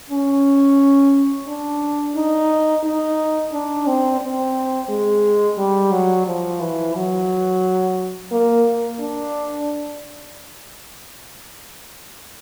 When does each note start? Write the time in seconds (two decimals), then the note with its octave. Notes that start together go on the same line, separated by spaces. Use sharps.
0.10 C#4
1.48 D4
2.16 D#4
2.84 D#4
3.53 D4
3.87 C4
4.21 C4
4.89 G#3
5.58 G3
5.92 F#3
6.27 F3
6.61 E3
6.95 F#3
8.32 A#3
8.99 D4